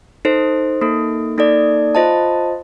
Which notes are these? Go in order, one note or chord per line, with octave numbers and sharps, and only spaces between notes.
D#4 A4 C5
A#3 D#4 A4
A#3 D#4 A4 D5
F4 C5 D#5 A5